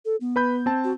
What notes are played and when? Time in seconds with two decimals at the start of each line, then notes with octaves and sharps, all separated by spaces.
0.05 A4
0.21 B3
0.36 B4 B5 G6
0.66 C4 A5
0.84 F#4